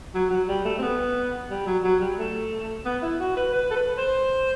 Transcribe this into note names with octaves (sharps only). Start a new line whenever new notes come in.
F#3
F#3
G3
A3
C4
B3
G3
F#3
F#3
G3
A3
B3
E4
F#4
B4
B4
A4
B4
C5